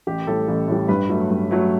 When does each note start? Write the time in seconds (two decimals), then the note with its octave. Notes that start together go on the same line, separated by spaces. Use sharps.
0.07 A1 G4
0.27 A2 G3 A4
0.48 A1
0.68 A2 G3
0.88 G2 B4
1.09 F#3 A3
1.31 G2
1.51 F#3 A3